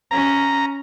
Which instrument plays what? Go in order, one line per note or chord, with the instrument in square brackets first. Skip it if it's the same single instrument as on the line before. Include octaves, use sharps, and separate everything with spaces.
[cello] C#4 [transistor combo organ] A#5